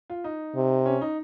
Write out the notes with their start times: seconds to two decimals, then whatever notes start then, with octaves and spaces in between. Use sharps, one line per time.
0.10 F4
0.24 D#4
0.56 C3
0.86 C#4
1.01 D#4